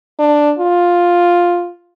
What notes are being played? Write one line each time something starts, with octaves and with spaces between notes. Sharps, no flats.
D4
F4